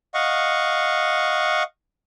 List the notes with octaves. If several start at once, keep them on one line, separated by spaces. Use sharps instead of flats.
D#5 F5 F#5 C#6